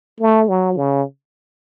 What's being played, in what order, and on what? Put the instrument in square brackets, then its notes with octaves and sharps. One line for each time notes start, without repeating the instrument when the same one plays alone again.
[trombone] A3
F#3
C#3